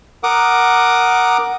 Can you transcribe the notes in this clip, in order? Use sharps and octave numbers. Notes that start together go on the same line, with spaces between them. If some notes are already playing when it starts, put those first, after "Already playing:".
A#4 F#5 D6 D#6